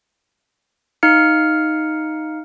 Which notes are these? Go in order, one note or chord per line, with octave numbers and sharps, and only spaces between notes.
D#4 F5 F6 C#7